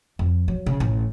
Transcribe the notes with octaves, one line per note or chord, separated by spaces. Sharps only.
F2
F#3
C#3
A1